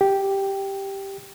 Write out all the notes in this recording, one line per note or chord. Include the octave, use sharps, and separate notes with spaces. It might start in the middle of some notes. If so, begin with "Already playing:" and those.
G4